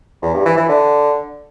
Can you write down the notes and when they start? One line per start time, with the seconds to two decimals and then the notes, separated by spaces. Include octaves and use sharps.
0.22 E2
0.34 G2
0.46 E3
0.57 E3
0.69 D3